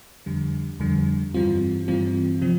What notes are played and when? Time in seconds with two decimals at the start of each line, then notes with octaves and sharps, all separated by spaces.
0.26 F2 D3 G3
0.80 F2 D3 G3
1.34 G2 E3 G3 C4 F4
1.88 G2 E3 G3 C4 F4
2.41 C3 F3 C4